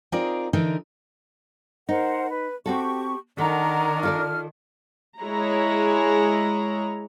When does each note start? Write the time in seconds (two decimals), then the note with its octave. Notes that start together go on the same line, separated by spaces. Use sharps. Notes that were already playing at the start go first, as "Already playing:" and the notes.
0.12 C4 D#4 F4 G#4 A#4 D5
0.53 D3 E3 D#4 A#4
1.89 D#4 A#4 C5 F#5
2.30 B4
2.66 C4 F#4 G4 A4 C#6
3.38 D#3 D4 A4 A#4 F#5 A#5
4.03 F4 A4 D5 F6
5.20 G#3 E4 G#4 C#5 A#5